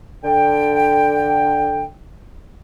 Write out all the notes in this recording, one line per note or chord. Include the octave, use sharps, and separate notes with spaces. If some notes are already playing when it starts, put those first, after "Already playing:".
D3 G5